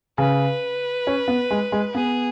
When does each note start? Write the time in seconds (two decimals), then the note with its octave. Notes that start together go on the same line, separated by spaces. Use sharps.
0.18 C#3 B4
1.07 C#4
1.28 B3
1.51 G#3
1.72 G#3
1.94 B3 G#4